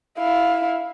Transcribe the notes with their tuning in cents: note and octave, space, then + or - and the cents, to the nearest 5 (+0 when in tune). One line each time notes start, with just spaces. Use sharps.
E4 +0 F5 +15